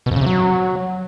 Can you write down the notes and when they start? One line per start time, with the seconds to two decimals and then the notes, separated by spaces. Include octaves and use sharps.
0.06 B2
0.11 F2
0.16 C#3
0.21 C3
0.26 F#3